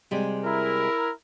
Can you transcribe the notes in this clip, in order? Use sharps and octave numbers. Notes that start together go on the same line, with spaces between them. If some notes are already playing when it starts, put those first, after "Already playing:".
C3 G3 G#3
E4 A#4